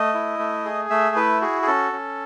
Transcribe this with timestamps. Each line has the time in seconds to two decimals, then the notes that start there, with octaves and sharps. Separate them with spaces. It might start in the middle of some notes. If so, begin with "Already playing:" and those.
Already playing: A3 D#5
0.14 E4
0.39 A3
0.65 G#4
0.90 A3 E5
1.16 E4 B4
1.41 F#4 G#4
1.62 G#4
1.67 C#4 A4
1.93 C#4